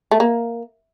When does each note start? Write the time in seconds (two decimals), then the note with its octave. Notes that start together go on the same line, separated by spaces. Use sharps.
0.11 A3
0.20 A#3